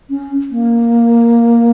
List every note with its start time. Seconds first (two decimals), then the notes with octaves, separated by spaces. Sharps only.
0.10 C#4
0.51 A#3